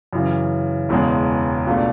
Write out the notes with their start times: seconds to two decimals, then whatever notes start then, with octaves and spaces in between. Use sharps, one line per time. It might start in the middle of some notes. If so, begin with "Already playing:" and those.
0.13 F#2 C#3 E3
0.89 E1 E2 C#3 G#3
1.67 C#2 B2 A3 D4